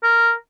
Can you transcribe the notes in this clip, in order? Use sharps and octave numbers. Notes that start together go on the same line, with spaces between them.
A#4